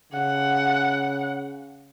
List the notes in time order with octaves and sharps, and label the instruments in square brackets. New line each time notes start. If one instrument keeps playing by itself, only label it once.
[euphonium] C#3 [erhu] F#5